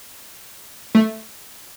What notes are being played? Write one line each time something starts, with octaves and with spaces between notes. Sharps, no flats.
A3